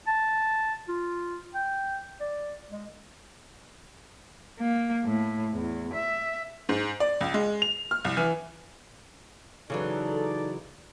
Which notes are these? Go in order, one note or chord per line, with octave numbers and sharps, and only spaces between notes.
A5
F4
G5
D5
G#3
A#3
A2
E2
E5
G#2
D5
C#2
G#3
F7
F6
C2
E3
C#3 E3 F#3 D#4 A4 D5